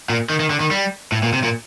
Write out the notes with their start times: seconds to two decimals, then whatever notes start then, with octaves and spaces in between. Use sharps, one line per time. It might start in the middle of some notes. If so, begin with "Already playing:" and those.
0.10 A#2
0.30 D#3
0.40 D#3
0.50 D3
0.60 D#3
0.71 G3
1.12 A2
1.23 A#2
1.33 C3
1.43 A#2